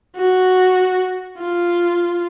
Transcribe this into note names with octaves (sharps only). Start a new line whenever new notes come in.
F#4
F4